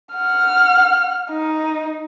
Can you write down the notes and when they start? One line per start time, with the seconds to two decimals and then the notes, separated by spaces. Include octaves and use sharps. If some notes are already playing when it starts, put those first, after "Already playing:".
0.13 F#5 F6
1.30 D#4